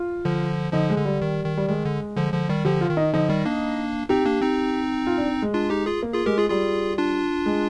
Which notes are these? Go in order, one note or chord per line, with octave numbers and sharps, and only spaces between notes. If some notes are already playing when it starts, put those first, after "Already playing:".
Already playing: F4
D3 F3
D3 F3 D#4
G#3
D3
G3
D#3
D#3
G3
D#3 G#3
D3
D3 F3
D3 F3
D#3 G3
D3 F3 G4
F4
D#3
D#4
D3 F3 D#4
D#3 G3
A#3 D4
C4 D#4 G4
A#3 D4
C4 D#4
F4
D4
G#3
D4 F4
D#4 G4
F4 G#4
A#3
F4 G#4
G#3 G4 A#4
F4 G#4
G3 F4 G#4
D4 F4
G#3